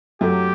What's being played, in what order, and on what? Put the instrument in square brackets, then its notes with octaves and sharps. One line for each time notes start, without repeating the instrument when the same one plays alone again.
[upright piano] F#2 F#3 A3 [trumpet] G4